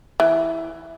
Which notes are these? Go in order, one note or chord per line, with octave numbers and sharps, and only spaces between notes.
E3